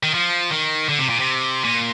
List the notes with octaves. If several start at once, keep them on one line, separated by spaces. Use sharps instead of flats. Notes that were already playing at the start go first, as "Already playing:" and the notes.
D#3
F3
D#3
D3
C3
A#2
C3
A#2